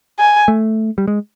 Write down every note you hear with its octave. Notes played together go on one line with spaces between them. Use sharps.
G#5
A3
G3
G#3